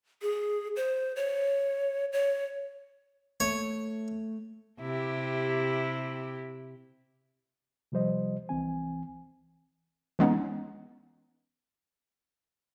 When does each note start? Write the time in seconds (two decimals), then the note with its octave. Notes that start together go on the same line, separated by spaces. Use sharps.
0.22 G#4
0.76 C5
1.16 C#5
2.12 C#5
3.40 A3 C#5
4.80 C3 E4 G4
7.92 C3 F3 G3 C5 D#5
8.49 C2 E3 C4 G#5
10.19 E3 G#3 B3 C#4 D#4